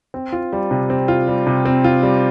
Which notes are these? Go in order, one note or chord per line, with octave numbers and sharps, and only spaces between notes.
C4
F4
G3
C3
C4
F4
G3
C3
C4
F4
G3